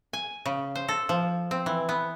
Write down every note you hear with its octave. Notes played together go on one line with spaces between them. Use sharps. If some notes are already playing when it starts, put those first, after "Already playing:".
G#5
C#3
C5
A4
F3
C4
E3
B3